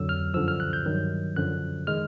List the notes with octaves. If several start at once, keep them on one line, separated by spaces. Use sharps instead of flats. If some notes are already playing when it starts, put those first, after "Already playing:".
Already playing: F2 D3 F#3 E6
F6
F#2 D3 F3 E6
F6
F#6
G6
G2 D#3 F#3
F#2 D3 F3 F#6
D#3 G#3 F6